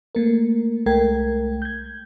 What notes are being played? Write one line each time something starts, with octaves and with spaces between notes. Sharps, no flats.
A3 A#3 A#4
C2 G#3 A3 A#4 G5 G#6
G6 G#6